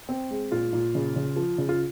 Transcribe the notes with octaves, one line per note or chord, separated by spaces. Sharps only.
C4
G#3
A#2 F4
A#2
C#3
C#3
F3
C#3
F4